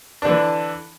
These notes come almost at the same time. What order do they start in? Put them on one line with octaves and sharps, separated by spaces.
D4 D3 E3